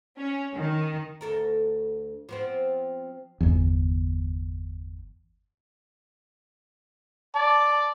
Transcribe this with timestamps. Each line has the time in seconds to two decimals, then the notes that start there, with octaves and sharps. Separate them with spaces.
0.18 C#4
0.55 D#3
1.21 D2 A4 A#4
2.29 F3 B3 C4
3.41 G1 E2
7.35 D5 A5